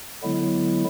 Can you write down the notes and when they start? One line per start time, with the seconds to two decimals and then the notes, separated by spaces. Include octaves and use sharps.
0.23 D3 F#3 G#3 B3 E4